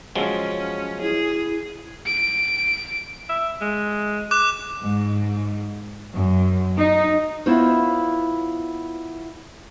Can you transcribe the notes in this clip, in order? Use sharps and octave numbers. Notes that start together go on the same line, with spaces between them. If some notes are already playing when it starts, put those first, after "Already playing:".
F3 F#3 G#3 C#4
E4 G#4
D7
E5
G#3
D6 F#6 E7
G#2
F#2
D#4
B3 E4 F4 C5 C#5